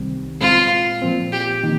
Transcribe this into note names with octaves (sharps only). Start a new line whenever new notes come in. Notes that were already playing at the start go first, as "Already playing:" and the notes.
Already playing: C2 C3 D#3 G3 C4
A#2 G#3 C4 F4
A#2 F3 C4
G4
D#3 A#3